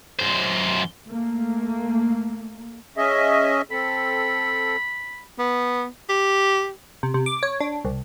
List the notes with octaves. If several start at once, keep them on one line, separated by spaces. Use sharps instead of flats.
F#2 C5
A3 A#3
C#4 G#4 D#5 E5
C4 A4 B5
B3
G4
C3
C3
D6
C#5
D4
C2